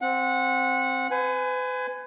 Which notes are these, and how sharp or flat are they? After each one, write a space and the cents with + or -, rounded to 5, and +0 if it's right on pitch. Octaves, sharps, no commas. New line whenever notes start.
C4 +0 F#5 -20
B4 +40 G#5 +0